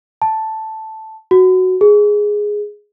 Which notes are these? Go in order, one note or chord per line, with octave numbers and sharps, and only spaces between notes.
A5
F#4
G#4